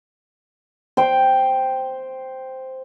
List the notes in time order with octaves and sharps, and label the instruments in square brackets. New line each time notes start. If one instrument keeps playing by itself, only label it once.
[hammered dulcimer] C5 G5